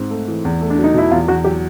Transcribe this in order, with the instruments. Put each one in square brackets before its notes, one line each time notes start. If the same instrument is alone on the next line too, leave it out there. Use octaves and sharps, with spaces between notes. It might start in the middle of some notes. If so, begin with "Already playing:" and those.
Already playing: [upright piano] G#2 C4
A3
E3
E2
A3
[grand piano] D4
[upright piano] F#3
[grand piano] D#4
[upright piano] B2 [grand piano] E4
[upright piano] E2 [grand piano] F4
[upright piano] E2 [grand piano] F#4
[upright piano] F#3 [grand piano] G4